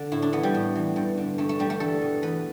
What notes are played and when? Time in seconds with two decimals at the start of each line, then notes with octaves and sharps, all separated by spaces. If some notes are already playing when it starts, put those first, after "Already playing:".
Already playing: D3
0.12 A2 E4
0.22 D4
0.33 E3 B3
0.43 G3
0.54 A2
0.75 E3
0.96 G2
1.17 D3
1.38 G2 A3
1.49 A3
1.59 D3 G3
1.70 A3
1.80 E2 A4
2.02 B2
2.22 E2 B4